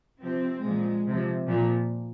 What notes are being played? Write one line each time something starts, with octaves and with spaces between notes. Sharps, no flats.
C3 F3 C4
A#2 F3 G#3
C3 F3
A#2 F3